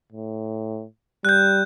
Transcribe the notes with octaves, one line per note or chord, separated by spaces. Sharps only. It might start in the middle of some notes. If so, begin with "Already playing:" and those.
A2
G3 F#6 G6